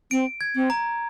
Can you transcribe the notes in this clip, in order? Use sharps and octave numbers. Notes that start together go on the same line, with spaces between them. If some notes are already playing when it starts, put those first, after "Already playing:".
C4 D7
G#6
C4
A#5